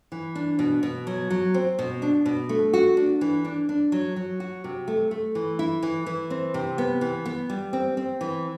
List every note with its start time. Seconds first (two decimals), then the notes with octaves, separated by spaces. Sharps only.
0.12 E3
0.35 D4
0.59 B2
0.83 B2
1.07 F#3
1.30 F#3
1.54 C4
1.79 B2
2.02 D4
2.26 B2
2.49 A3
2.73 F#4
2.97 D4
3.21 E3
3.44 D4
3.69 D4
3.92 F#3
4.16 F#3
4.40 F#4
4.64 C3
4.88 A3
5.11 A3
5.35 E3
5.59 E4
5.83 E3
6.06 E3
6.30 C4
6.54 C3
6.78 B3
7.01 E3
7.25 B3
7.50 G3
7.73 C4
7.97 C4
8.21 E3